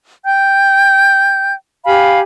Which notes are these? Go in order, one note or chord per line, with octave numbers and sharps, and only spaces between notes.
G5 G6
G4 F5 G#5 B5